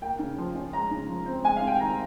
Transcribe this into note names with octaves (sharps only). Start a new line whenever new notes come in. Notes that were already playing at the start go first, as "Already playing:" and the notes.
A#3 G5
C#3
F3
C#4
G#3 A#5
C#3
F3
C4
G#3 G#5
F5
C3
G5
D#3 A#5